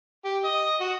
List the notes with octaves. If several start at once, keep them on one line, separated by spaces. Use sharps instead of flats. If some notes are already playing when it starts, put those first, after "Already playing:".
G4
D#5
F#4